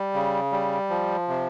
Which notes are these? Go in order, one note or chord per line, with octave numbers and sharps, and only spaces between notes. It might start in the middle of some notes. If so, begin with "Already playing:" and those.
Already playing: G3
C#3
G3
F3
C3